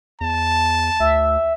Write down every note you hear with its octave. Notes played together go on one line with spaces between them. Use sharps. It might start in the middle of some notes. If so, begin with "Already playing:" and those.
E2 A5
D2 E5